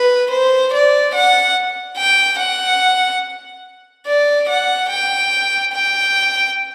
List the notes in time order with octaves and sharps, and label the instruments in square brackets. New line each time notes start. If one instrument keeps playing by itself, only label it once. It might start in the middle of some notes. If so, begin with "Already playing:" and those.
Already playing: [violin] B4
C5
D5
F#5
G5
F#5
D5
F#5
G5
G5